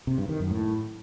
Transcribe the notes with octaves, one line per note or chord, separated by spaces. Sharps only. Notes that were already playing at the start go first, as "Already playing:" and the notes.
C3
G2
D#3
F#2
A2